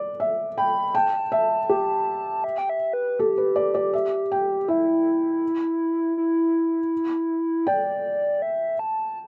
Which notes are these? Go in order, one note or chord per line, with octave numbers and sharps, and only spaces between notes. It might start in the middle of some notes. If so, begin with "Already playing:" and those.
Already playing: D5
E5
G5 B5
G5 A5
E5
G4
E5
G5
E5
B4
G4 A4
B4
D5
D5
E5
G5
E4 E5
E4
D5 G5
E5
A5